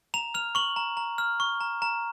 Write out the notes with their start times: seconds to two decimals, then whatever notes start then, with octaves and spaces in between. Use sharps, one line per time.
0.14 A#5 F7
0.34 F6 F7
0.55 C#6 F#7
0.76 A#5
0.97 A#5
1.18 F6
1.40 C#6
1.61 A#5
1.82 A#5